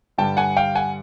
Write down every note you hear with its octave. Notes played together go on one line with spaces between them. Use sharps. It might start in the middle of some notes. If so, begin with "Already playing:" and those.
G2 D3 G3 G5 A5
F#5 G#5
F5 G5
F#5 G#5